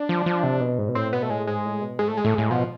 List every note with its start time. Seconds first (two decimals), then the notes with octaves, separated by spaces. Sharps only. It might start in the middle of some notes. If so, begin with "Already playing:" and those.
Already playing: D4
0.09 F3
0.26 F3
0.44 C3
0.61 B2
0.78 G#2
0.89 B2
0.95 A2 C4
1.13 B2 B3
1.22 A3
1.30 A2 G#3
1.47 G#2 G#3
1.65 A2
1.81 B2
1.99 G#2 G#3
2.08 A3
2.12 A2
2.17 G#3
2.25 A2 A3
2.36 A2 G#3
2.50 B2 F3